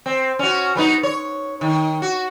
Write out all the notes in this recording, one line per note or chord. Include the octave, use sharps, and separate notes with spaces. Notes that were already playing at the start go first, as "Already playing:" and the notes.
C4
C#4 F#4
F#3 B3 D#4
C#5
D#3
F#4